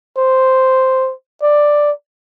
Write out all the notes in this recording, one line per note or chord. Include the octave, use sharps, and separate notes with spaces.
C5
D5